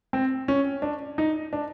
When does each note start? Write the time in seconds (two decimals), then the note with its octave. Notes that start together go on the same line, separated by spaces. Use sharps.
0.13 C4
0.48 C#4
0.82 D4
1.18 D#4
1.53 D4